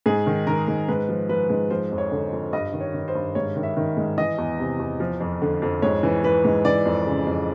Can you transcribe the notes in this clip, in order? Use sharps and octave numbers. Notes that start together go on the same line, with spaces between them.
G#2 G#4
D#3
D#3 A#4
G#2
G#2 B4
F3
F3 B4
G#2
F3 C5
F2
C#5
D3
F2
G2 D#5
D#3
C#5
D#3
C5
G2
G#2 C#5
D#3
E5
D#3
G#2
E3 D#5
E2
C3
E2
F3
F2
D3
F2
G#2 C#5
E3
E3 B4
G#2
E3 D5
F2
C#3
F2